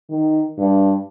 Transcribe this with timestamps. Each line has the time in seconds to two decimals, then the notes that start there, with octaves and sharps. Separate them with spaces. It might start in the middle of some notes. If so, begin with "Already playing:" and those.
0.10 D#3
0.59 G2